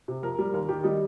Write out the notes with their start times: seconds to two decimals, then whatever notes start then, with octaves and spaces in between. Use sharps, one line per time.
0.08 C3
0.23 F2 A#4
0.39 G3
0.53 D#2 A#4
0.69 D#3 G4
0.84 G3 D#4